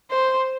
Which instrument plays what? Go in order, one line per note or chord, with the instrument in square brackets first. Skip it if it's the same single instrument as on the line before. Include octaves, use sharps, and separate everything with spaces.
[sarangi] C5